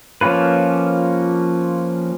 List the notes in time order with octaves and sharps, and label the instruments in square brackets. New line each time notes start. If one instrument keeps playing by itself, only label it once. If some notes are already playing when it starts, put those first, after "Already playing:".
[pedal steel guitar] F3 A#3 C#4 F4 B4